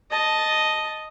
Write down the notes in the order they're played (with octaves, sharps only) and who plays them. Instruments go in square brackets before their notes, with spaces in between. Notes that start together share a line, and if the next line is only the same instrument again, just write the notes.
[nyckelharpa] D#5 A5